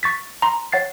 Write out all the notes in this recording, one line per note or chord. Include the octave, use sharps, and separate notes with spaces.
C#6 A6 B6
A#5 C6
C#5 F#5 A6 C7